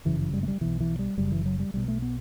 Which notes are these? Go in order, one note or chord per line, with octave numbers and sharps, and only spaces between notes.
G1 F#2 C#3 E3
E3
G3
A3
G3
B1 B2 E3
E3
G3
F#1 F#2 C#3 G3
E3
F#3
G3
B1 B2 G3
A3
B3